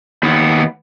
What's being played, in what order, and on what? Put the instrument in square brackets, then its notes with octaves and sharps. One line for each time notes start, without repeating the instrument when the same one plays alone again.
[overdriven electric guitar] D#2 B3